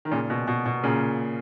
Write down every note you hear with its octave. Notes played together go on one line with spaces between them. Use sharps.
D#3
A#2 C#3
B2
B2
B2
A#2 C#3